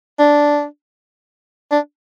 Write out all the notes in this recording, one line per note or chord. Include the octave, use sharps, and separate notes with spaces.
D4
D4